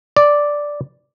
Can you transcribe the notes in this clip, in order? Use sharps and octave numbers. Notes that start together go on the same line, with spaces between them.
D5